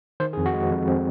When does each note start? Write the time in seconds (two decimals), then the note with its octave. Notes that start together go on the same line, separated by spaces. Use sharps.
0.20 D#3 C5
0.33 G#4
0.37 F2
0.46 F#4
0.53 G#3
0.71 F2
0.88 C4